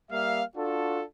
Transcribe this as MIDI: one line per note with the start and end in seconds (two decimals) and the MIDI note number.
0.11 0.42 55
0.11 0.42 58
0.11 0.42 76
0.11 0.42 77
0.56 1.03 62
0.56 1.03 65
0.56 1.03 66
0.56 1.03 69